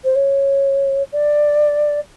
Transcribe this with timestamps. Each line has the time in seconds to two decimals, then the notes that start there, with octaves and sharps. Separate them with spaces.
0.04 C5
0.16 C#5
1.12 D5